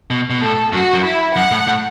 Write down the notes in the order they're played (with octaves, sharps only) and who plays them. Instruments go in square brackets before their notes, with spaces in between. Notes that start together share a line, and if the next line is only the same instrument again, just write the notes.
[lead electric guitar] B2
B2
[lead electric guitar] A2 [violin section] A4
[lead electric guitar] F#2 [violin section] F#4
[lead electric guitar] F#2
[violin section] E4
[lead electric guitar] F#2 [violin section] F#5
[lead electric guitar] A2
A2